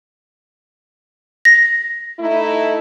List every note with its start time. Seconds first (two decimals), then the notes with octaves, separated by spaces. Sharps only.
1.45 A#6
2.19 A3 D#4 E4